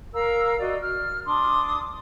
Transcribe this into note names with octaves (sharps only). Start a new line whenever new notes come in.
A#4 F5 A#5 E6
F#4 D5 D#5
F6
D4 C6 D6 D#6